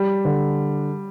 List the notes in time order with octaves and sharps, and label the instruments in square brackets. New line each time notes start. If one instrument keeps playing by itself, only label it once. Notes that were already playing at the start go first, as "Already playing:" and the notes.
Already playing: [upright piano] G3
[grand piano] D3